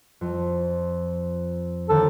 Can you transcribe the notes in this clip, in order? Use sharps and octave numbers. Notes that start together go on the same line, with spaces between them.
F2
D#2 D3 A4